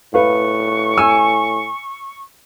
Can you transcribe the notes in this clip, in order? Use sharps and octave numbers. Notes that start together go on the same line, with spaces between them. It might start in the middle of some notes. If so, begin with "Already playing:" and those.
A2 B4 F5 C#6
G#5 E6